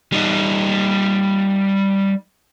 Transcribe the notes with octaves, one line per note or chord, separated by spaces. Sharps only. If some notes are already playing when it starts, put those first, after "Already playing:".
G3 D#4